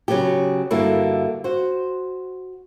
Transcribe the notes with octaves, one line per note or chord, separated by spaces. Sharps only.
C#3 F#3 B3 F#4 G4
G2 D3 A#3 E4 F#4
F#4 C5